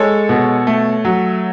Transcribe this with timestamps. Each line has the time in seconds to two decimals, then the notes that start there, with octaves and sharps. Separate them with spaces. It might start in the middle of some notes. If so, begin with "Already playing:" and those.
Already playing: G#3 A4 C#5
0.29 B2
0.67 A3
1.05 F#3